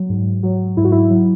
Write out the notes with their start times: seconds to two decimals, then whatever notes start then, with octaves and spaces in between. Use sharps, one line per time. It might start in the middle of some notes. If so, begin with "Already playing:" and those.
Already playing: F#3
0.09 G#2
0.43 F#3
0.77 G#2 E4
0.84 F#4
0.92 E4
1.10 F#3